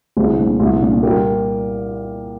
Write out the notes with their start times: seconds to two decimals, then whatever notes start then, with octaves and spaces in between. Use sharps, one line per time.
0.17 C2 G#4 C5
0.38 A#2
0.60 C2
0.81 A#2
1.03 G3 G4 A#4